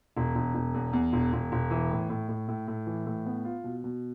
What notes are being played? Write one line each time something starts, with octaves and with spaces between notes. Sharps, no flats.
E1
E1
E1
E2
E2
E1
E1
E1
E3
A2
A2
A2
A2
A2
E3
A2
B3
F4
B2
B2